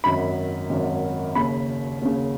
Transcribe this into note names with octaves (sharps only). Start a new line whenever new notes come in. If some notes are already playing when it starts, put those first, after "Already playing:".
G#1 F#2 D#3 B5
G#1 F#2 D#3
D#2 C#3 B5
D#2 C#3